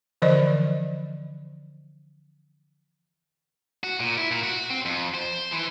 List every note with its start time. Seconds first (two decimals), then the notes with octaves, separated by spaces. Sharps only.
0.22 D3 E3 F3 C5 D5 D#5
3.84 F#4
4.00 A#2
4.18 E4
4.31 A#2
4.43 F#4
4.70 C4
4.85 F2
5.14 C5
5.52 E3